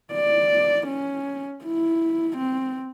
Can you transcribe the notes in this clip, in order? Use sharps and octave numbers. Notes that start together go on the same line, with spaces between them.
D5
C#4
E4
C4